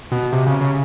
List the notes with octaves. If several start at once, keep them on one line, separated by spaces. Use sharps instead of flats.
B2
C3
C#3
C#3